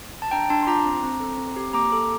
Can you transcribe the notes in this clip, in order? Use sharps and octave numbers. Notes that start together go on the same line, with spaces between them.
A5
D4 G5 A#5
D4 A5 C6
C6
F4 A#5 D6
C4
C4
A4
C4
G4
A#3 A#5 D6
A4